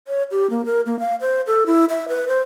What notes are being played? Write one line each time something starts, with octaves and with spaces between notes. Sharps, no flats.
C#5
G4
A#3
A#4
A#3
F5
C5
A4
E4
E5
B4
C5